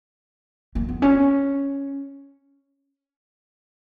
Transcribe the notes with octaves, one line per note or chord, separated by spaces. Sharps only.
A#3
B3
C#4